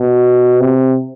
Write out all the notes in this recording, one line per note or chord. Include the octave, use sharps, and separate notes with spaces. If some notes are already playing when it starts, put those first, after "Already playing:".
Already playing: B2
C3